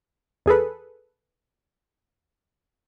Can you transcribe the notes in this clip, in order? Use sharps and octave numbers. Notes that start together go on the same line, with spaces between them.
E2 G#4 A4 B4